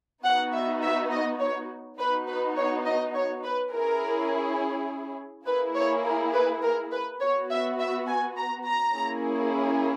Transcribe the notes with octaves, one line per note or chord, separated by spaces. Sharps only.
B3 D#4 F#4 F#5
E5
E5
D#5
C#5
B3 D#4 F#4 B4
B4
C#5
D#5
C#5
B4
C#4 E4 G#4 A#4
A#3 E4 G#4 B4
C#5
A#4
B4
A#4
B4
B3 F#4 C#5
E5
E5
G#5
A#5
A#5
A#3 C#4 E4 G#4